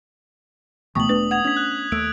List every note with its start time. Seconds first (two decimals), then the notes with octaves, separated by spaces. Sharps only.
0.95 C#2 B2 E3 A3 B3 C#6 D#6 F#7
1.09 E1 A3 D4 B4
1.31 F#5 D#6 G#6 F7
1.45 C#4 D4 G#6 B6
1.57 F#6
1.92 D#2 A3 E6 D7